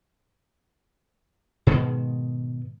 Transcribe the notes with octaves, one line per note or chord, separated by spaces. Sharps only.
G#2 B2 D#3 G#3